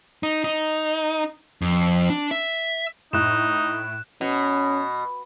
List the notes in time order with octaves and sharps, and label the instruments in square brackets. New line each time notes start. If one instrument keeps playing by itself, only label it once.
[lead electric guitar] D#4
D#4
F2
D4
E5
[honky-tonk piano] A2 [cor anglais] D#4 [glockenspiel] F#6 E7
[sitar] B2 [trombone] C#4